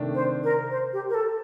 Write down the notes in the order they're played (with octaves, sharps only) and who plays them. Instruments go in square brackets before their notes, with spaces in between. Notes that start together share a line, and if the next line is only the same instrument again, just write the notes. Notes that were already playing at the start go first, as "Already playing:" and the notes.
Already playing: [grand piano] C3 D#3 A3 D4
[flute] C5
A#4
C5
G4
A#4
A4